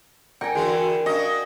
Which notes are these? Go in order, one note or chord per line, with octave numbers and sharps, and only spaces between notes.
A#4 D5 G5 G#5 A#5 C#7
D3 E3 F#4 G#4 C6
D4 F#4 A#4 D#5 F5